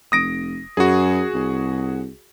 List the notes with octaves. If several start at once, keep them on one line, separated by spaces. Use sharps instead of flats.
F1 D#6 A#6 D7
F#2 F#4 G#4
C2